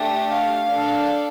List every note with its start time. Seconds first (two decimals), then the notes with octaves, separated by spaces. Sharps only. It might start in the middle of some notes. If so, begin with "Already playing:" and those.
Already playing: A3 D4 G4
0.28 F5
0.70 D4 A4